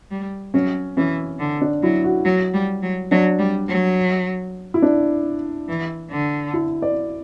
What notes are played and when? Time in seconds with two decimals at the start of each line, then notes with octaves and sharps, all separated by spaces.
0.11 G3
0.54 F#3 C#4
0.97 E3 C#4
1.40 D3
1.61 D4
1.83 F#3 E4
2.04 F#4
2.25 F#3
2.54 G3
2.83 F#3
3.11 F#3 D4
3.39 G3
3.68 F#3
4.74 E4
4.82 D4
5.68 E3
6.10 D3
6.54 E4
6.82 D5